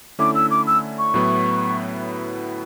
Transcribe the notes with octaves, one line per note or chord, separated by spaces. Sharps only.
D3 A3 C#4 E4 D6
E6
D6
E6
C#6
A2 F#3 B3 E4 B4